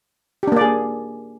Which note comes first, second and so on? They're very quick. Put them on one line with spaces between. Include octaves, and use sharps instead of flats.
G4 D4 A#3 D5 G#4